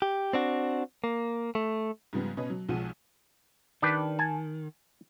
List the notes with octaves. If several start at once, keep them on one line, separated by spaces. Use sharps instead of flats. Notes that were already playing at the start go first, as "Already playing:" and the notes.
G4
C4 D4 F#4
A#3
A3
G#2 C#3 F3 G3 B3
B2 C#4 B4 C#5 D#5
F#3
B1 F3 G#3 F#5 D#7
D#3 D4 G4 B4
G#5 A5